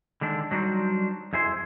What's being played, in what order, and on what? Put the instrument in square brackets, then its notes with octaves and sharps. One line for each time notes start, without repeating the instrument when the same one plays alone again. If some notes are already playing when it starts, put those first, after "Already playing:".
[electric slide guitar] D3 D#3 G#3 D4
F#3 G3 D4 D#4 F#4 C5
F2 E4 G#4 C5